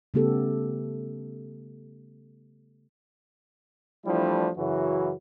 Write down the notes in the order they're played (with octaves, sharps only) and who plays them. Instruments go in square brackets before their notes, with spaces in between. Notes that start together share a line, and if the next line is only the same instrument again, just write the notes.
[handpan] C#3 G3 A3 B3 G4 A4
[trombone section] E3 F3 G3 A3 D4 E4
F#2 C#3 E3 E4 F#4